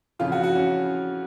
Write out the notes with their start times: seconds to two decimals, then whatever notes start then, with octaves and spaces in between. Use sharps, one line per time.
0.19 F2 C#3 E3 F4
0.32 F#4
0.44 F#4
0.55 C#4